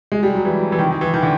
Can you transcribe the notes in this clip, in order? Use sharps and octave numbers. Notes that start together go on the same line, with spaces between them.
G#3
G3
F#3
E3
E3
D#3
D#3
E3
D#3
D3